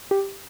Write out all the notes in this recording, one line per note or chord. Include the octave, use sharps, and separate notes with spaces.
G4